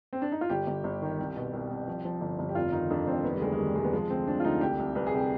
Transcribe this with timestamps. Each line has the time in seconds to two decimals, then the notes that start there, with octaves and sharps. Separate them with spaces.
0.13 C4
0.22 D4
0.32 D#4
0.41 F4
0.49 G1 G4
0.67 G1
0.84 G1
1.02 D#3
1.19 C2
1.36 B2
1.53 C2
1.70 C2
1.88 F3
2.05 F3
2.21 G1
2.39 G1
2.49 G4
2.55 F1 F4
2.72 D#3 D#4
2.90 F2 D4
3.07 F1 C4
3.24 D#3 B3
3.34 G3
3.41 D2 G#3
3.53 G#3
3.58 D#3 G3
3.76 C3 G#3
3.85 B3
3.93 F3 G#3
4.10 D2 C4
4.28 F3 D4
4.40 F4
4.45 D2 D#4
4.61 C2 G4
4.79 C2
4.95 C2 B4
5.07 G#4
5.13 C3 G4